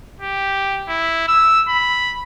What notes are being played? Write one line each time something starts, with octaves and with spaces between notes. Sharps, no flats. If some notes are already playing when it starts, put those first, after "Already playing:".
G4
E4
E6
B5